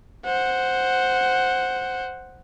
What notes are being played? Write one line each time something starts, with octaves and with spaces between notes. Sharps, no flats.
C5 F#5